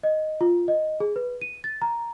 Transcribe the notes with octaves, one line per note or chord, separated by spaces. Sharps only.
D#5
F4
D#5
G#4
B4
D#7
A6
A#5